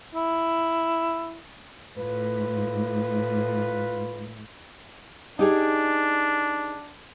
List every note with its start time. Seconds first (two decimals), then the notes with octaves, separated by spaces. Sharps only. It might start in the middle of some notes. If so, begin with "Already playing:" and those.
0.15 E4
1.97 A2 F4 B4
5.39 D4 D#4 G4 G#4